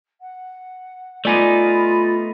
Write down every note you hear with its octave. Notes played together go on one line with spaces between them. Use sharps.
F#5
A3 B3 D#4 F4 D5 G#5 B5 D6